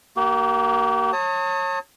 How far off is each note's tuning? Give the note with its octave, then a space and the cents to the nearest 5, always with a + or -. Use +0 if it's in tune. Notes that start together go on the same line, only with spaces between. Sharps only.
A#3 +0 G4 -45
C#5 -25 A5 +35 D#6 +20